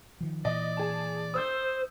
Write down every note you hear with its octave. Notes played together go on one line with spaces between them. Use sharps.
D#3 F3
A#2 E3 D5 D#5
G#4 A5
C5 D#6 E6 G6